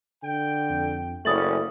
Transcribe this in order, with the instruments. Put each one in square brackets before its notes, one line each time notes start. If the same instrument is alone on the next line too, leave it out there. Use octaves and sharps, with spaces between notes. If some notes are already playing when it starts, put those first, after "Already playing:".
[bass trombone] D3 [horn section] G5
[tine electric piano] F2
[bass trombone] F#1 [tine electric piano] A3 E4 D5 [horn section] C#4 [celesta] D#6 A6 F#7